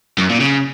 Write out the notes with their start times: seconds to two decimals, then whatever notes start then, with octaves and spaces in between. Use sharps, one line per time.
0.18 F#2
0.29 A#2
0.40 C#3